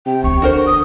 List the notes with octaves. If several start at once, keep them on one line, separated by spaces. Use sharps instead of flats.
C3 G5
D2 B3 C#6
D3 F#4 A#4 C5
G#3 D#6